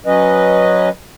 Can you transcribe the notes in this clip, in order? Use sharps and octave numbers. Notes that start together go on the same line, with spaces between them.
F#3 C#4 B4 D#5